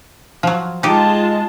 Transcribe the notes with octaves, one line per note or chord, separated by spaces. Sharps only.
F3 F#3
G#3 D#4 F4 G4 G#4 A5